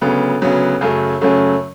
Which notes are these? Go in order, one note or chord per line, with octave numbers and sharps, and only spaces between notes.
D2 C#3 F#3 B3
D2 C#3 F#3 B3
F#2 C#3 F#3 A3
F#2 C#3 F#3 A3